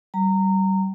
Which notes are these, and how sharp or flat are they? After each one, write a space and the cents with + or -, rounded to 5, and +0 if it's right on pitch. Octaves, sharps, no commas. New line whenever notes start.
G3 -25 A#5 -20